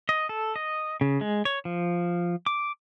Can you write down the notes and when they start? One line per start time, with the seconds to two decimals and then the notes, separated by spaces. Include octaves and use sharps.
0.09 D#5
0.29 A4
0.56 D#5
1.01 C#3
1.21 G#3
1.45 C#5
1.65 F3
2.46 D6